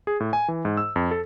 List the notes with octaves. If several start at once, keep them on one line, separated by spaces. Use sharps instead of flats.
G#4
A2
G#5
E3
G#2
E6
F2
A4